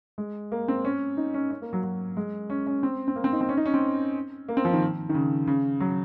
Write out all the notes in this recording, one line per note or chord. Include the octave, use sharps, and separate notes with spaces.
G#3
A#3
C4
C#4
D#4
C#4
C#4
A#3
F#3
F#3
G#3
C#4
C#4
C4
C4
A#3
C4
D#4
C4
C#4
D#4
C#4
C4
A#3
C4
F3
D#3
D#3
C#3
C#3
F#3